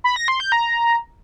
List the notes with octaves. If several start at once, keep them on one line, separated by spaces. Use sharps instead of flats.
B5
A#6
C6
G6
A#5